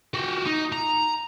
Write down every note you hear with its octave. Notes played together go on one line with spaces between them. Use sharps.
F#4 G4
D#4
A#5